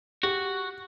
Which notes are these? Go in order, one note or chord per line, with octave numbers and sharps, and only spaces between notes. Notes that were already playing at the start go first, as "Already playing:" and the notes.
F#4 G4